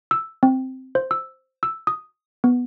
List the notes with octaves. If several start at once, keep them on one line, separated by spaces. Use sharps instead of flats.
E6
C4
C5
E6
E6
D#6
B3